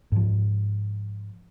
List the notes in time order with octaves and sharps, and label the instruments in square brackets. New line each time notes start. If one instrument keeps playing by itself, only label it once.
[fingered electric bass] G#2 F3